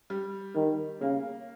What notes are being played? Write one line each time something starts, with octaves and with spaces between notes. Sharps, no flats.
G3
D#3 G3
C#3 A#3